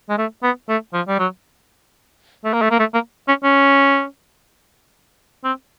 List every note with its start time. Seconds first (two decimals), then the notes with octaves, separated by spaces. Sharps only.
0.09 G#3
0.18 A3
0.43 B3
0.69 A3
0.93 F3
1.07 G3
1.19 F#3
2.44 A3
2.53 A#3
2.62 A3
2.71 A#3
2.79 A3
2.93 A#3
3.28 C#4
3.44 C#4
5.44 C4